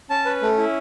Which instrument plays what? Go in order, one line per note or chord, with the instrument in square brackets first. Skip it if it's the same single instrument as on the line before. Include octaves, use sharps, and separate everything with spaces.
[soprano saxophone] C#4 [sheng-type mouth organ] A5
[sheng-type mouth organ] B4
A3
E4